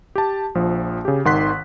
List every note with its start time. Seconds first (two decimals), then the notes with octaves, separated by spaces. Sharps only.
0.15 G4 A5
0.55 A#1 F3
1.05 C#3 G4
1.25 G#1 D#3 F#5 C6 F#6 B6